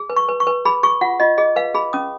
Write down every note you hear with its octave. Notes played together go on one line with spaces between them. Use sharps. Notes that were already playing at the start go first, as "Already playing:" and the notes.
Already playing: G#4
B4
C#6
B4
C#6
B4
G#4 B5
G#4 C#6
F4 F#5
F4 D#5
G#4 D#5
B4 F5
G#4 B5
C#4 D#6